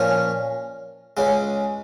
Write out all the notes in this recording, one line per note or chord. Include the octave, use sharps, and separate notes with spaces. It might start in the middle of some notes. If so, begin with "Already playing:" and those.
Already playing: A#2 F3 C#4
C#2 C#3 G#3